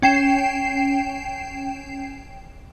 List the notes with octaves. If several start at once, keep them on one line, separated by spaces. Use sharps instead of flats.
C#4 G5 C7 E7